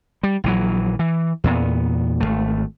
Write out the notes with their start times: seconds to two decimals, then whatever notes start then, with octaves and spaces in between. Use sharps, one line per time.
0.23 G3
0.44 A#1 E3 F#3
0.99 E3
1.44 E2 A#2 B3
2.20 G#1 E2 A3